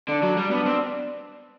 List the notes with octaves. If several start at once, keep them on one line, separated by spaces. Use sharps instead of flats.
D3 D4
F#3
G3
B3 D4
C4